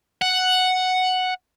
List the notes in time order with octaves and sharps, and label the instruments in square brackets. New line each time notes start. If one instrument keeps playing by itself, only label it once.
[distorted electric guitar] F#5